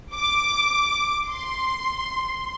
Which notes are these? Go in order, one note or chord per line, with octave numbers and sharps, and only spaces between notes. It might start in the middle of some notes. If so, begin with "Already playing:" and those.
D6
C6